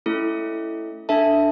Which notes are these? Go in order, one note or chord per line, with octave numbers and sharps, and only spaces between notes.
A3 C#4 E4 A4
D4 A4 E5 A5